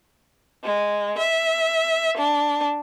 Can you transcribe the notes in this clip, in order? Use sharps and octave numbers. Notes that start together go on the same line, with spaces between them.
G#3
E5
D4